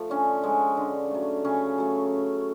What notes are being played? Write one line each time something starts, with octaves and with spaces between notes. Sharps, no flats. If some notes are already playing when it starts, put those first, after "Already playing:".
Already playing: F3 A3
D3 C#4
F3 G#3
D3
F#3 A3
C#3 C#4
F#3 A3